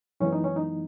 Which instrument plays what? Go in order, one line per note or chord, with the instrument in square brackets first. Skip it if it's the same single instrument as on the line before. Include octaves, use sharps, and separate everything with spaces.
[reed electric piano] F#2 E3 G#3 B3 C#4
D#4
C#4
D#4